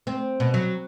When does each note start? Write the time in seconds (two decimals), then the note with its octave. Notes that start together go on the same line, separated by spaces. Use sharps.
0.07 C4
0.40 B2
0.54 F#3